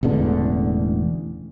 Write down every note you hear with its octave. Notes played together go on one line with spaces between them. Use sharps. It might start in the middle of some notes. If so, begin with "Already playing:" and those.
E1 A1 E2 D3